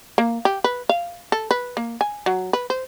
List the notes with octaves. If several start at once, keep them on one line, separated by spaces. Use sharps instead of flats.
A#3
G4
B4
F5
A4
B4
A#3
G#5
F#3
B4
C5